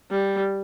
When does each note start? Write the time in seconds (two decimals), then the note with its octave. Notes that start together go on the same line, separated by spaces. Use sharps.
0.11 G3